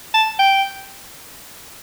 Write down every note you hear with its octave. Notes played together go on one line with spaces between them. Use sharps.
A5
G5